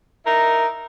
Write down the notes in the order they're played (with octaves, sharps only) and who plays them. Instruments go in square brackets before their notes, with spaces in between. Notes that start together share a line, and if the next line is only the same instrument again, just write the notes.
[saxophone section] D#4 E4 A#4